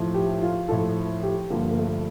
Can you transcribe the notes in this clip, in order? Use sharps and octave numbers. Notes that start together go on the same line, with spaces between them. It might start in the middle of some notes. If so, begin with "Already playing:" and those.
Already playing: A2 F3
G4
F4
A2 F3 A4
G4
G2 D3 F3 A#3
A#3
A3